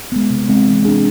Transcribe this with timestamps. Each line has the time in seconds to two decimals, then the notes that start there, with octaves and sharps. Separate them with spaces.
0.12 G#3 B3
0.30 C3
0.49 G#3 C4
0.68 E3
0.85 G#3 D4 G#4